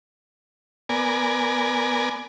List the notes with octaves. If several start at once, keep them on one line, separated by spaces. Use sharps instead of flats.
B3 A#4 D5 G#5